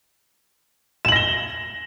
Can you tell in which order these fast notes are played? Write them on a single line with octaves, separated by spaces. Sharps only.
E7 F#7 A#6 G7